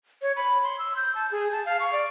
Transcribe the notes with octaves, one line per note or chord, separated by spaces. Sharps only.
C#5
B5
C6
E6
G6
A5
G#4
A5
F5
C#6
D5